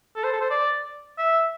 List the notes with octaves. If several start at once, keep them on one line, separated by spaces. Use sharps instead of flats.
A4
C5
A4
C5
D5
E5